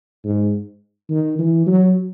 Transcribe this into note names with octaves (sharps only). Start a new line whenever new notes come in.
G#2
D#3
E3
F#3